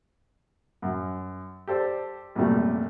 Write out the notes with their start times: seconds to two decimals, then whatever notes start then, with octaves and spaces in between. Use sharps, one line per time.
0.82 F#2
1.68 G4 A4 C5 D5
2.35 A#1 F#2 C3 F3 G3 A3